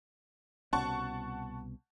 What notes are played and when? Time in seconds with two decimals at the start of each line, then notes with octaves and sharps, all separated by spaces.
0.73 C2 B2 C#4 F#5 A5 C#6